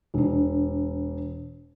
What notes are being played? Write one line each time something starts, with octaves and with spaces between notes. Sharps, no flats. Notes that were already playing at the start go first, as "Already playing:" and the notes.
E1 D4